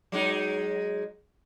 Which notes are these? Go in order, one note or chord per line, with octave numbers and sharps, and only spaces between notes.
F#3 G#3 D#4